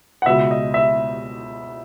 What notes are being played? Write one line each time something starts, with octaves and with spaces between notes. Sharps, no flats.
F#5
C#2 B2 E5
D#5
E5